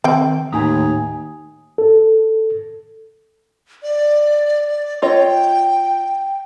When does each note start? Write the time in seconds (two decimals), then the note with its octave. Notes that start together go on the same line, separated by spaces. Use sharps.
0.04 D#3 C4 G5
0.52 D#2 A2 G#5 A#5 D#6
1.78 A4
3.83 D5
5.02 F4 C#5 D#5 G5